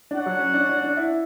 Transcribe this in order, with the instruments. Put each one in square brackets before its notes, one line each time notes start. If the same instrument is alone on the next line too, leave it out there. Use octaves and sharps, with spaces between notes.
[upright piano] D4 [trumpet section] F#4 C#5 F#5
[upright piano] F#3
C#4
D4
D4
D4
E4